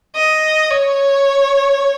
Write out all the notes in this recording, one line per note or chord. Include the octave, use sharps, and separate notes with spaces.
D#5
C#5